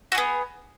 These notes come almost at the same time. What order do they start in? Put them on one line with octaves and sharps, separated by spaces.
F#4 G#4 B3